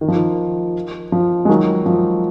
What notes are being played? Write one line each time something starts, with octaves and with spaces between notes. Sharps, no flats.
D#3
F3
D#3
F3
G#3
D#3 F#3
F3